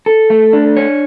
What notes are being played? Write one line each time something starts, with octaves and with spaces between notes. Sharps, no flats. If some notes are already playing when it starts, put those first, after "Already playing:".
A4
A3
D4
C#5